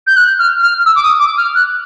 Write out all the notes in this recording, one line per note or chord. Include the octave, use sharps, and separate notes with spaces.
G6
F#6
F6
F6
E6
D6
D#6
D6
F6
F#6